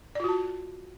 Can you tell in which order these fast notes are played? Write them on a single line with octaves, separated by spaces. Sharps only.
D5 F4 F#4 A5